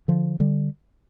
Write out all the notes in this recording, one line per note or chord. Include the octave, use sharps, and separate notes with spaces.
D3 F3
D3 G3